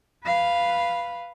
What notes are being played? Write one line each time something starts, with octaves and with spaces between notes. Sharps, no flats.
B4 F5